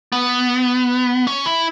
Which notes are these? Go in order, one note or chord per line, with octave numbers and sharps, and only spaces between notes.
B3
C#4
E4